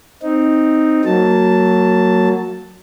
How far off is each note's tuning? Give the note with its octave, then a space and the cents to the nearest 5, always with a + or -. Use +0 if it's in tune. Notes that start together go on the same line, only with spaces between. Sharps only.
C4 +0 D#4 +0
F#3 +0 A#3 -25 A5 +0